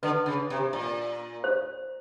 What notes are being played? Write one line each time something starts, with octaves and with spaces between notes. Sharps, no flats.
D3 B4
C#3
C3
A#2
C5